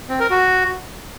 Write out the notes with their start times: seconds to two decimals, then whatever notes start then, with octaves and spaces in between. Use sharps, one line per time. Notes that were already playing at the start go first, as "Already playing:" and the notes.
0.09 C4
0.20 A#4
0.31 F#4